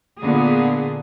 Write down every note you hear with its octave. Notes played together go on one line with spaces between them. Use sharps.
A#2 D3 B3 G#4